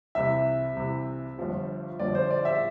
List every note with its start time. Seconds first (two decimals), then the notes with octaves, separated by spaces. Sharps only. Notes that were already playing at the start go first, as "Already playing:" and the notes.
0.15 C2 C3 E3 E5
0.77 C2 C3 E3
1.38 G1 G2 F3
1.99 G1 G2 F3 D5
2.15 C5
2.31 D5
2.45 E5